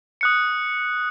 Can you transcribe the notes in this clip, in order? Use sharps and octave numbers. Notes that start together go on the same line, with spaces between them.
D#6 F#6 C#7